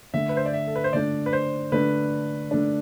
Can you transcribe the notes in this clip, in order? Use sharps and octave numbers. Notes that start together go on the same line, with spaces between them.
D3 A3 D4 E5
B4
C5
D5
E5
A4
B4
C5
D3 A3 D4 D5
B4
C5
D3 A3 D4 B4
D3 A3 D4